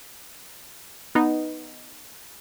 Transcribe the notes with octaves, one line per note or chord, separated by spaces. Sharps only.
B3 D#4